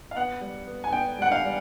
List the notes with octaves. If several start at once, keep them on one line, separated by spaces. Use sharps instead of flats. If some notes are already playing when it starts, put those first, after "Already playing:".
F5
B3 F#5
G3
B3
G#5
B3 G5
G3 F#5
F5
G3